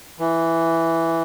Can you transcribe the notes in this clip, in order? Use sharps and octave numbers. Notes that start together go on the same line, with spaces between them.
E3